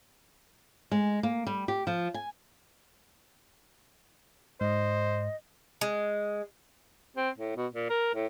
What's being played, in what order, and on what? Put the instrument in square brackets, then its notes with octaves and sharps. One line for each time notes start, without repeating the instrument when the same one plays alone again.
[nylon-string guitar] G#3
A#3
G3
G4
F3
G#5
[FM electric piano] G#2 [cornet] C5 [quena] D#5
[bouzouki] G#3
[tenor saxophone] C4
A2
B2
A#2
A#4
A2